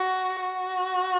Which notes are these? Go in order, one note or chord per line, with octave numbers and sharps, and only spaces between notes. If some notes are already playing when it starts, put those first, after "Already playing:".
Already playing: F#4
F#4